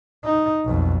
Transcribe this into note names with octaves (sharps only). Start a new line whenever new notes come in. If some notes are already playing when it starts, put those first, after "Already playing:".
D#4
B1 F2